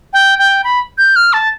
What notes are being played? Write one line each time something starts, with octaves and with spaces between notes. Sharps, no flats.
G5
G5
B5
G6
F6
A5